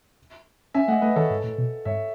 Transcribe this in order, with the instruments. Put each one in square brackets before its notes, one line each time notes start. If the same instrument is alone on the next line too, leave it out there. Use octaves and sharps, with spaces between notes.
[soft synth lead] C#4 [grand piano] E5 G#5
[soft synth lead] A3 [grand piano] D#5 F#5
[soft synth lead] A3 [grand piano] B4 D#5
[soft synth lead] D#3 [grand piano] A4 C#5
[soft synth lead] G#2
A2
B2
[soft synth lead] G#2 [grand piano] C#5 E5